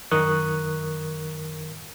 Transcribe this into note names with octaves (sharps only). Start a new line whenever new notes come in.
F#2 D#3 A#4 C#6 D#6 F#6